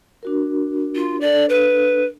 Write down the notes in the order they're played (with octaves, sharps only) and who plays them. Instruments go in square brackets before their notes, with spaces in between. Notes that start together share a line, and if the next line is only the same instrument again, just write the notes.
[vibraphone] D4 F#4 A#4
[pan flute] F4
[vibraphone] D4 A4 [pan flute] D5
[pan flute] B4